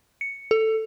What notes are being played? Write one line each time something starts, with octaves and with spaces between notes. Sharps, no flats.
C#7
A4